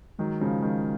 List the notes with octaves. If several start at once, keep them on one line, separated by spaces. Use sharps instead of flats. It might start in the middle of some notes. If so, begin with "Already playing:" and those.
D#3 F#3 G#3
C#3 F3 G#3
D#3 G#3